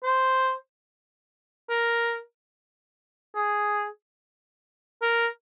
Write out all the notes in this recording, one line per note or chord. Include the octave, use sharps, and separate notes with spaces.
C5
A#4
G#4
A#4